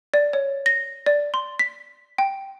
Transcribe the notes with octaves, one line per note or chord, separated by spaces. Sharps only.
D5
C#5
A#6
D5
C6
B6
G5